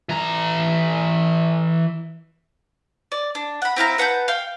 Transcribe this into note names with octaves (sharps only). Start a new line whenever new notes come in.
E3 A#5
D5
D4
F#5 B5
C4 E4 F5 A#5
B4 F#5 A5 G6
F5 G5